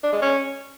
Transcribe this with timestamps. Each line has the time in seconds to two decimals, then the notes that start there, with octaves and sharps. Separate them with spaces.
0.03 D4
0.13 G#3
0.22 C#4